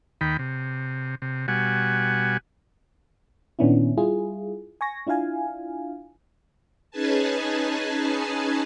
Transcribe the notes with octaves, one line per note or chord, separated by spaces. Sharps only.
D#2 D#3 G5 B5
C3
C3
B2 G3 F#4 F#5 G#5
A#2 D#3 B3 C#4 D4 E4
G3 E4 F4 G#4
G#5 C#6 A#6
D4 E4 F4 F5 G#5
C#4 D#4 G#4 B4 G#5 A5